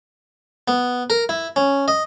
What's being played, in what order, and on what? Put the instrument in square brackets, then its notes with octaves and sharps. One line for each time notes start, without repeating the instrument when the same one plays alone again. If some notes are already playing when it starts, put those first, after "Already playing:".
[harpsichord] B3
A#4
E4
C#4
D#5